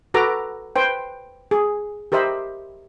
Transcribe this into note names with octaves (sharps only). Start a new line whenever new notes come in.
F#4 A4 B4 A#5 D6
B4 C5 G5
G#4
G4 A#4 C5 D#5 E5 B5